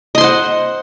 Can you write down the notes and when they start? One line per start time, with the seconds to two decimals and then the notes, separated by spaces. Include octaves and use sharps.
0.15 D#5
0.18 C6
0.21 C5
0.24 F#5